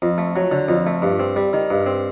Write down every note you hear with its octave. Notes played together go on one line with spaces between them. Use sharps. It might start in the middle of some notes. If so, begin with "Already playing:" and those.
F2
A3
F#3
D3
F2
A3
G2
C4
G3
D#3
G2
C4